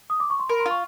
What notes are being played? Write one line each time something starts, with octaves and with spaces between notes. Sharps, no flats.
D#6
D6
C#6
C6
A#4 B5
C6
F4
C#6